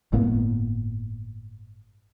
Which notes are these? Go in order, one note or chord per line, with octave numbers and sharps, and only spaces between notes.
G1 A2 A#3 B3